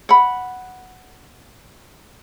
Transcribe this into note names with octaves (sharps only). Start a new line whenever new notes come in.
F#5 B5